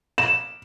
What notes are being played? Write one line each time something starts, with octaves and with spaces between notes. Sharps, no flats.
E7